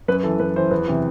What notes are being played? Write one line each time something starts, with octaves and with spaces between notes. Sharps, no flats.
F#2 B4
E3 A4
F#2 B4
E3 C5
E2 B4
C3 E3